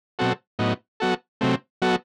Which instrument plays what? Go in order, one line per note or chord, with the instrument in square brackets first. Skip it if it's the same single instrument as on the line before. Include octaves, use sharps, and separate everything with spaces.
[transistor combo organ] B2 F#3 C4 F#4 A4
A2 F#3 B3 D#4
F#3 B3 F#4 A4
C3 F#3 A3 C4
F#3 B3 F#4 A4